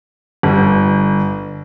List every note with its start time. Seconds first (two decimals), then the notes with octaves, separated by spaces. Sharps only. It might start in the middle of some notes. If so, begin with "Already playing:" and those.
0.43 G1